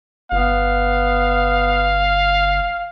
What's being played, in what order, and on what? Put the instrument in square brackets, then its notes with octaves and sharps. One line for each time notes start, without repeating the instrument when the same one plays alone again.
[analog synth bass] G1 [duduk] B3 [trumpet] F5